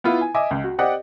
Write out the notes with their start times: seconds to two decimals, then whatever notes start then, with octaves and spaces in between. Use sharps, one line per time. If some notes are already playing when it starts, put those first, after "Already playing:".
0.04 B3 E4 F4
0.21 G#5
0.34 D#5 E5 G#5 D6
0.51 C#2
0.64 F#4
0.78 C4 G4 D5 D#5 F#5